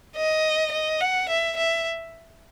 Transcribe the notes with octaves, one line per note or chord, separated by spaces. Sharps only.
D#5
D#5
F#5
E5
E5